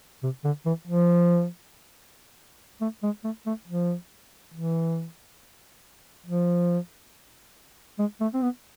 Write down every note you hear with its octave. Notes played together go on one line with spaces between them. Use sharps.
C3
D3
E3
F3
A3
G#3
A3
A3
F3
E3
F3
G#3
A3
C4
B3